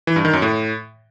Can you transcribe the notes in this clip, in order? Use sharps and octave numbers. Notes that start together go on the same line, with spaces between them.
E3
G2
D#3
F#2
A2